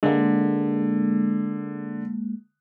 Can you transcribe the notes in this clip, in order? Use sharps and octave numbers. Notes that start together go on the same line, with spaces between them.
D3 G#3 A#3